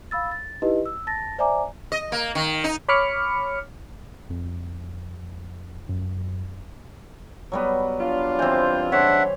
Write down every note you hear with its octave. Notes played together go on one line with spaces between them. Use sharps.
F5 B5 E6 A6
A6
D#4 E4 G4 B4 D#5
E6
A5 A6 A#6
C5 D5 E5 G#5 A#5 D6
D#5
A#3
D#3
D#4
C#5 B5 D6 F6 C#7
F2
F#2
F#3 G3 B3
D4 F4
E3 C4 C5
C#3 D4 C5 C#5 E5 F#5